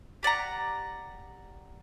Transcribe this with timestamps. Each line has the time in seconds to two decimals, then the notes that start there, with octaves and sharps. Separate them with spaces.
0.23 G4 D5 F#5 A#5